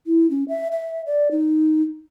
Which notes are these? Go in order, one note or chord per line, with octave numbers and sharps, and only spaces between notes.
E4
C#4
E5
E5
D5
D#4